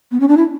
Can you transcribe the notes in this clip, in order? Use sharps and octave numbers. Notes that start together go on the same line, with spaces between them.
B3
C#4
D4
E4